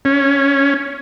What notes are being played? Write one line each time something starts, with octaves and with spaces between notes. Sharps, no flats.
C#4